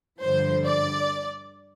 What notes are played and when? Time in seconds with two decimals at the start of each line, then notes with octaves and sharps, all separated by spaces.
0.21 G2 D3 F3 C5
0.65 D5